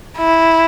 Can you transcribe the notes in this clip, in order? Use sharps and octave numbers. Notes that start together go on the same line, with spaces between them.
E4